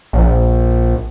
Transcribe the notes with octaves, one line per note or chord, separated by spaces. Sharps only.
A#1